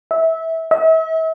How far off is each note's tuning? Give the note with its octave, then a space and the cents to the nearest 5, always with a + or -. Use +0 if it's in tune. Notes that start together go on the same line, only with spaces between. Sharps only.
E5 -20
E5 -40